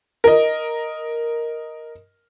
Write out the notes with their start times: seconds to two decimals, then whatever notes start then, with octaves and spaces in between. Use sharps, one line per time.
0.24 A#4 D#5